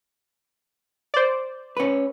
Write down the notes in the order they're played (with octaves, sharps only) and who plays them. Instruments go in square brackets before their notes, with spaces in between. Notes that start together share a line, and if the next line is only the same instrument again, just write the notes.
[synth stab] C5 D5
[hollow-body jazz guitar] C#4 B4